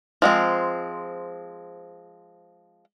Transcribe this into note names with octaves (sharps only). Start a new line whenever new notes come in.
F3 G#3 C4